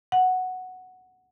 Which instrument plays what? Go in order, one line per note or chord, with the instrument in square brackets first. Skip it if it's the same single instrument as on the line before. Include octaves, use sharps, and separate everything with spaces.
[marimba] F#5